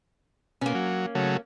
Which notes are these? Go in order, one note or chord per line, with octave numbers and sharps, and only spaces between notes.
B2 A#3 C#4
F#3
C#3 F#3 A3